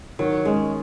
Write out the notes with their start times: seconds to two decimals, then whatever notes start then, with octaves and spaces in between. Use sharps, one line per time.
0.19 D#3 F#3
0.45 G#3 C#4